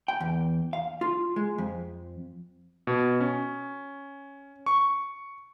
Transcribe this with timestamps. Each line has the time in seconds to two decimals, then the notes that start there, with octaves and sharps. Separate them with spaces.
0.08 G5
0.20 E2
0.73 F5
1.01 F4
1.36 G#3
1.58 F2
2.87 B2
3.20 C#4
4.66 C#6